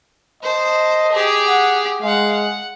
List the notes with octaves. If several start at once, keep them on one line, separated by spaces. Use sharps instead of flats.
C5 D#5 A5
G4 G#4
F#5
G#3 F5 F#5
F#5